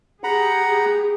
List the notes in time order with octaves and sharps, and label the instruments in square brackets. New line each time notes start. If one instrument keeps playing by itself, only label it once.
[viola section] G4 G#4 [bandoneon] F#5 A#5 B5